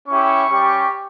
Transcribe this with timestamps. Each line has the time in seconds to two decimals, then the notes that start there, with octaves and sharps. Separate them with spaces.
0.08 C#4 E4 G4 C#6
0.47 G3 C#4 G4